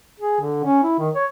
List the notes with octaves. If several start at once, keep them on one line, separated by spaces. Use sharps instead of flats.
G#4
D3
C#4
E4
D#3
C#5